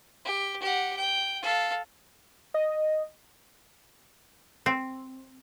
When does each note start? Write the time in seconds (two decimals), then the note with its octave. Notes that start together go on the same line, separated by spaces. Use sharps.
0.25 G4
0.62 G4 F#5
0.96 G5
1.42 A4 F5
2.54 D#5
4.66 C4